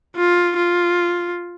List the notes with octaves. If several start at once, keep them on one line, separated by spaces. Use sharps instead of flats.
F4
F4